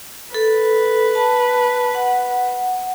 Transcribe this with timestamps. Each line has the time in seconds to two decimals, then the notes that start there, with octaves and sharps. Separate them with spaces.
0.34 A4 B4
1.15 A5
1.95 F#5